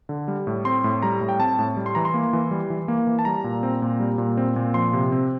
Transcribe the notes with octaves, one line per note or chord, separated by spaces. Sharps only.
D3
G3
A2
C4 C6
A2
G3 A#5
A2
G5
C4 A5
A2
G3
C6
E3 A#5
C6
A#3
E3
G3
E3
A#3
E3
A5
G3 A#5
A#2
C4
A#2
G3
A#2
C4
A#2
F3 C6
C3
C4